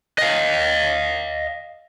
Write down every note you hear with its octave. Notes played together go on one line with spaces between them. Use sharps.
D#5 F5